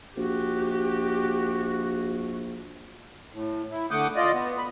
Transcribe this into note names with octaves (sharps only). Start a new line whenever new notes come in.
A#1 F#4 G4
A2
E4
D3 A3 F#5 D6 D#6 G6
F4 D5 D#5
B3
B5